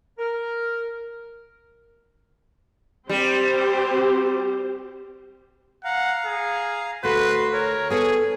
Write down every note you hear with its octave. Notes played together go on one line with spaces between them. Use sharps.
A#4
G3 C4 G4 C5
F5 F#5 A#5
G#4
D2 F#4 A4 B4 C6
A#4 C#5
B3 G#4 A4